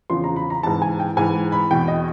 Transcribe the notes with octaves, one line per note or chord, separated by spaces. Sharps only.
E2 C#3 F3 C6
A#5
B5
A#5
G#2 E3 A5
G#5
G5
G#2 E3 G#5
B5
E2 B2 G5
D#5